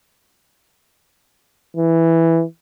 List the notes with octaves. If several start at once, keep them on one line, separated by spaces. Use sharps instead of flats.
E3